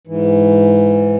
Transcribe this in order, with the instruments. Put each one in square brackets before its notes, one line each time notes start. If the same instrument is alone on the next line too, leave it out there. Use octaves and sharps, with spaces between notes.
[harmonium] G#2 E3